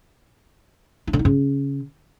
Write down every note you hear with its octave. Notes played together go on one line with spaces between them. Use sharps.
D4
D3
D#4
C#3